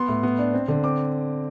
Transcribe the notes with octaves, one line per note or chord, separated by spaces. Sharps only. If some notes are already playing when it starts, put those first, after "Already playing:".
Already playing: B3 C6
A2
B3
D4
C4
D3
C4 D6